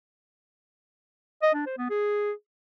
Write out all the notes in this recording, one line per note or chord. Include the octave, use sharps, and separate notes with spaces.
D#5
D4
C5
B3
G#4